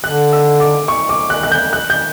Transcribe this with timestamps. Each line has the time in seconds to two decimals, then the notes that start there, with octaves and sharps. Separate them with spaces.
0.04 D3 F#6
0.33 E6
0.60 D6
0.88 C#6
1.09 D6
1.30 F#6
1.43 F#6
1.52 G6
1.73 F#6
1.90 G6